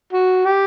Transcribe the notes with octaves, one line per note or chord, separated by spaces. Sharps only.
F#4
G4